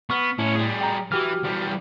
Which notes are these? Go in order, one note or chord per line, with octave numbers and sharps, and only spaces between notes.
B3 C#6 F6
A2 C#4 E4
G3 G#4
G5 A#5
E3 F#4 G4 F6
E2 G3